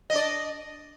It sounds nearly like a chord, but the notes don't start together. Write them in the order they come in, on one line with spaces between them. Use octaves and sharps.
D#5 D4 D5